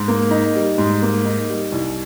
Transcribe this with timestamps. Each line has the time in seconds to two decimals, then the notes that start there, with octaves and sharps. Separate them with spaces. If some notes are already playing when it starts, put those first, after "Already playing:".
Already playing: G#2
0.08 A#3
0.31 D#4
0.55 G3
0.78 G#2
1.02 A#3
1.25 D#4
1.49 G3
1.72 C2